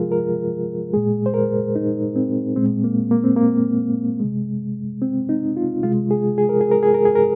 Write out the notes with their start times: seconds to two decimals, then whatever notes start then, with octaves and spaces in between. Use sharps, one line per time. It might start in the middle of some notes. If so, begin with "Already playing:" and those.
Already playing: C3 F3 G#3 F4 G#4 A#4
0.12 A#4
0.94 A#2 G#3 G#4
1.26 C5
1.34 A#4
1.76 D#4
2.16 C4
2.56 A#2 G#3 C4
2.84 A#3
3.11 A#3
3.24 C4
3.36 A#3
4.20 C3 G#3
5.02 C4
5.29 D#4
5.57 F4
5.83 C3 G#3 F4
6.11 G#4
6.38 G#4
6.49 A#4
6.61 G#4
6.72 A#4
6.83 G#4
6.94 A#4
7.05 G#4
7.16 A#4